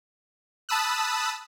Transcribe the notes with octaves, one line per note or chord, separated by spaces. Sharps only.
A5 B5 D#6 E6 F#6